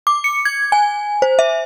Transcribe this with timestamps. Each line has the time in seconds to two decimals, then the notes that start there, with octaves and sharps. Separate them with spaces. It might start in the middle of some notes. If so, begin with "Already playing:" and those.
0.07 D6
0.24 C#7
0.45 G#6
0.72 G#5
1.22 C5
1.39 E5